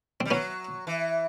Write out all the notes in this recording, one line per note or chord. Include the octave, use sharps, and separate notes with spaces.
G3 C4
F#3 B3 C#4
E3